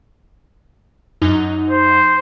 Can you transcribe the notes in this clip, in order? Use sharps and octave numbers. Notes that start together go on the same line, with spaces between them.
F#2 D#4
C5